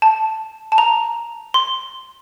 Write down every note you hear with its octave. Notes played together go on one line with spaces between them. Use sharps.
A5
A5
A#5
C6